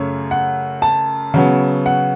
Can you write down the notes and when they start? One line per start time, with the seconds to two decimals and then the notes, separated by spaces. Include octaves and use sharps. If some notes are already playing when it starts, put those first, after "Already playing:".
Already playing: F#2 C#3 A3 C#5
0.31 F#5
0.82 A5
1.34 C#3 F#3 B3
1.86 F#5